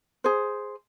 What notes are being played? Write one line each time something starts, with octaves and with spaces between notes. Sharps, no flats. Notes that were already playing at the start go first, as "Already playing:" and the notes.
G#4 C5